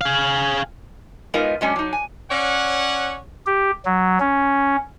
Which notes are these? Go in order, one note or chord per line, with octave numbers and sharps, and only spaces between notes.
G#4 F5
G#3 B3 D#4 F4 A#4
F#3 G#3 C#4 D4
F#3 D#4
G#5
C#4 C#5 D5 F#5
G4
F#3
C#4